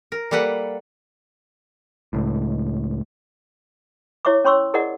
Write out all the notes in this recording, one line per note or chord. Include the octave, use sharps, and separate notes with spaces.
A#4
G3 A#3 A4 B4 F#5
C#2 A2
E4 C#5 E5 C#6 D6
C#4 C#5 C6 C#6 E6
E4 G#4 A#4 D5 D#5 F#5